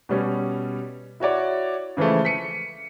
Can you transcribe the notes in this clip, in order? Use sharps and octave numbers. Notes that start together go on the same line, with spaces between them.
B2 G3 C#4
E4 F#4 C#5 D5
C#3 E3 F3 G#3 A3
B6 C#7 D#7